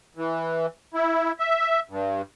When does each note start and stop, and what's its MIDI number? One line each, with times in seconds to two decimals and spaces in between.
0.17 0.66 52
0.94 1.32 64
1.39 1.80 76
1.90 2.22 43